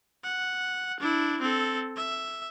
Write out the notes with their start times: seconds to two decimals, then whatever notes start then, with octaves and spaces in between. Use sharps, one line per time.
0.24 F#5
1.00 D4 E4
1.41 C4 A4
1.97 E5